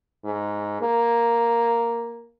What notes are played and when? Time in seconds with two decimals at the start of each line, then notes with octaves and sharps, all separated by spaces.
0.25 G#2
0.81 A#3